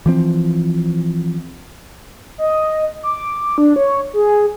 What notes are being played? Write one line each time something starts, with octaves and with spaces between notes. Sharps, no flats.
E3 F3 C4
D#5
D6
D4
C#5
G#4